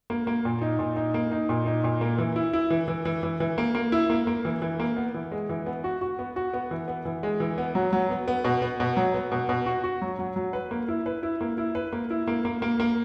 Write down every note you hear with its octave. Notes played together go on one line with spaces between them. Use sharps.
A#3
A#3
A#2
D#4
A#2
D#4
A#3
D#4
A#2
D#4
A#2
A#3
E3
E4
E4
E3
E3
E3
E3
E3
A#3
A#3
E4
A#3
A#3
E3
E3
A#3
B3
E3
G#3
E3
B3
F#4
F#4
B3
F#4
B3
E3
B3
E3
G#3
E3
B3
F#3
F#3
B3
B3
B2
B3
B2
F#3
B3
B2
B2
F#4
F#4
F#3
F#3
F#3
B4
A#3
E4
B4
E4
A#3
E4
B4
A#3
E4
A#3
A#3
A#3
A#3